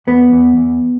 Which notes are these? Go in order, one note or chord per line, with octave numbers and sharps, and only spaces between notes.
E2 B3
E2
E2